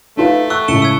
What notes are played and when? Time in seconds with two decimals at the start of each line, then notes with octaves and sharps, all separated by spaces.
0.17 A3 D#4 F4 B4
0.50 C#6 E6 F#6
0.68 C#2 A2 E4 C#7 E7 G7
0.82 E6 G#6